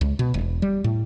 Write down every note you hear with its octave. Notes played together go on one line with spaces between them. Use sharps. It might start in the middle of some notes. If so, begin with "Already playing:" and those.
C#2
B2
E1
G3
A2